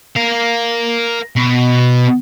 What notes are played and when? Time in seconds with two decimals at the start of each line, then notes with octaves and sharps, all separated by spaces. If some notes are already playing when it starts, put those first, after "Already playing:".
0.16 A#4 F5
1.36 B2